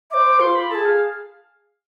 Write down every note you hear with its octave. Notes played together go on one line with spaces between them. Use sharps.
C5 E5 D6
F4 C6
B5
A4 A5
G#4
F5